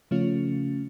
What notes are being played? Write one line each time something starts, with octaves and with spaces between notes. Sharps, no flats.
C#3 F3 A3 C#4 F4